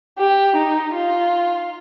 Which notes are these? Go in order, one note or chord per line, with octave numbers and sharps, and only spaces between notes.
G4
D#4
F4